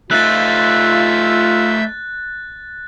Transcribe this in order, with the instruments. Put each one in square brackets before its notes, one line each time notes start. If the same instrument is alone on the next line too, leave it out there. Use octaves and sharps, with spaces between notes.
[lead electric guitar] A3 D#4 [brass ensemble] F4 [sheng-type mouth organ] E5 E6 G6 [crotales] F#6 A6